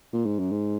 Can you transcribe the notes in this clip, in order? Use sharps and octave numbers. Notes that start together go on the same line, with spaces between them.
A#2
G#2
F#2
G#2